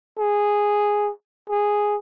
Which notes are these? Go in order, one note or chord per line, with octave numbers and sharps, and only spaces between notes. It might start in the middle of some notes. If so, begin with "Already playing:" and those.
G#4
G#4